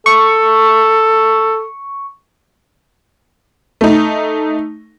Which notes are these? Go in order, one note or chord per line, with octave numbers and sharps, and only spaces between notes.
A4 C#6
A3 D#4